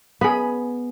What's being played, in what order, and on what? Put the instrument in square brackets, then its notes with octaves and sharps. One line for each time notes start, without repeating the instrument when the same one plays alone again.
[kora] B3 [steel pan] G#4 B5